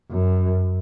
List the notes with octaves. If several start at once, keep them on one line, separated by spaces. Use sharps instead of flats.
F#2